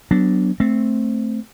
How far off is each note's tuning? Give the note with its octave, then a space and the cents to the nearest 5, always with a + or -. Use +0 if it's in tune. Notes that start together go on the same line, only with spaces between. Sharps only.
F#3 +20 B3 +0 D4 +0
A3 +0 C4 +0